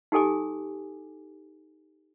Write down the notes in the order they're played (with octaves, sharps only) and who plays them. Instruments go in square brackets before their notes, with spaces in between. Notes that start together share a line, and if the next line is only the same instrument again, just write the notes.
[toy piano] D#4 G4 A4 G#5 D6